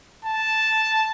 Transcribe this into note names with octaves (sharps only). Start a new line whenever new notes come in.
A5